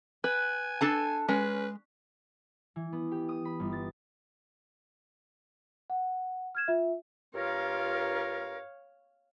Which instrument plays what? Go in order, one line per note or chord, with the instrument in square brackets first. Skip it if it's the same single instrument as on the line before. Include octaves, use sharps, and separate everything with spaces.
[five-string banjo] B4 [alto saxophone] G#5 [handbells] F#6
[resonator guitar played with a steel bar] D4 A4 A5
[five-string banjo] G#3 [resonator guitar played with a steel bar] C#4 [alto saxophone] B4
[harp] E3
B3
G4
D#6
B5
G1
A6
[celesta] F#5
F6 G#6 E7
F4 E5
[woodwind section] G2 F4 A#4 [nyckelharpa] C#5 F5